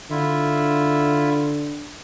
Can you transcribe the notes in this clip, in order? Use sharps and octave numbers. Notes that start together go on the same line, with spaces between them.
D3 E4 F4 E5